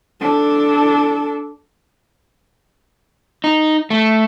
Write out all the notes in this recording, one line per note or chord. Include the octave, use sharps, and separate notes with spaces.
D4 A4
D#4
A3